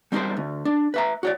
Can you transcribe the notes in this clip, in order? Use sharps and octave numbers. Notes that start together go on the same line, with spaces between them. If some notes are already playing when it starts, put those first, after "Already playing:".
G3 C4 D#4 F4 A#4 C5
D2
D4
B4 E5 A#5
F#4 C#5 D5